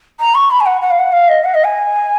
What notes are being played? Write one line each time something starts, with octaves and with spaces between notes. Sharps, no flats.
A#5
C#6
B5
G#5
F#5
F#5
F5
F#5
F5
D#5
F#5
D#5
G#5